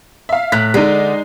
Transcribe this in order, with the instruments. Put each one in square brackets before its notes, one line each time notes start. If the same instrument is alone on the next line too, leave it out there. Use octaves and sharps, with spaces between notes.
[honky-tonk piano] E5 F5
[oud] A2 [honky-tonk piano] F#6 B6
[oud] D3 [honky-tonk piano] G#3 D#4